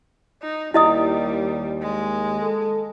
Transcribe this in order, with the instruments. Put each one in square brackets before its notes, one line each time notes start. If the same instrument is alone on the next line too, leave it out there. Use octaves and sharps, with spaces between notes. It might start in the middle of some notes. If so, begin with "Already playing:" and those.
[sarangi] D#4
[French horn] D#2 [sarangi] G3 [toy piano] E4 D#5 D#6
[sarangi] G#3
[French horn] A4